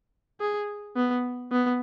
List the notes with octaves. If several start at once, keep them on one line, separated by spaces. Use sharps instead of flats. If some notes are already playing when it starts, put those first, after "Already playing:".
G#4
B3
B3